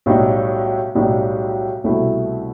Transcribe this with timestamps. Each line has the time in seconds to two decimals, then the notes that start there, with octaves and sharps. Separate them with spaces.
0.06 B1 A2 G3 D#4
0.95 B1 A2 G3 D#4
1.84 C2 B2 A3 C4 E4